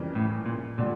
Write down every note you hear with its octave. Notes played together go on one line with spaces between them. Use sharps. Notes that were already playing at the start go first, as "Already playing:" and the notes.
Already playing: F2 C#3 E3 G3 A#3
A2
A#2
A#2 D3 G3